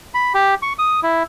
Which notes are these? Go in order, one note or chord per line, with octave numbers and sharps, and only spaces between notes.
B5
G4
C#6
D#6
E4